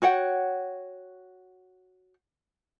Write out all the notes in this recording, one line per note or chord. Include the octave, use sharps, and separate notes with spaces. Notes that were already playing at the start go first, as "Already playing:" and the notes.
F#4 C#5 F#5 G5